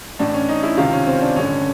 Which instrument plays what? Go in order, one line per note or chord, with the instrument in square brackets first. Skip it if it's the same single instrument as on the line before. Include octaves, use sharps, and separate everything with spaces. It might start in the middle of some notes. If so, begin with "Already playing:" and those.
[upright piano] A1 A2 E3 D4
C#4
D#4
E4
C#2 C3 D#3 F4
C#4
C4
D4
A1 G2 D3 C#4